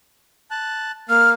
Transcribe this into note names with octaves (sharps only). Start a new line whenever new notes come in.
A5 F#6
A#3 F6